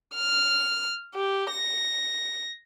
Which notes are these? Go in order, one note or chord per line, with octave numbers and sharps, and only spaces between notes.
F6
G4
A#6